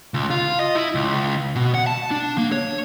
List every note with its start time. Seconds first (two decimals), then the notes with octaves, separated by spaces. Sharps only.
0.14 C#2
0.30 F4
0.59 D#5
0.75 E4
0.95 C#2
1.55 B2
1.75 F#5
1.87 A5
2.11 D4
2.38 A#3
2.52 C#5